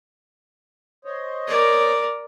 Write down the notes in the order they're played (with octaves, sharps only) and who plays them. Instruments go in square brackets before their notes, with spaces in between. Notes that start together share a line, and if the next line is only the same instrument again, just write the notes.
[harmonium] C5 C#5 D#5
[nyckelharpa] A#4 D5